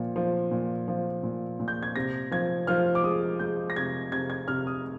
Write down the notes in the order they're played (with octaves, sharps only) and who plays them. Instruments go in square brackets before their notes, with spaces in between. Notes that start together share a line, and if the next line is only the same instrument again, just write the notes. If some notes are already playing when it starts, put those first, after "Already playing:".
Already playing: [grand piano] A#2 F3
F3
A#2
F3
A#2
A#2
G6
G#6
C3 A#6
F3 G#6
F3 F6
D6
G#3 D#6
G#3 G6
A#6
C3 G#6
C3 G#6
G#6
C3 F6
D#6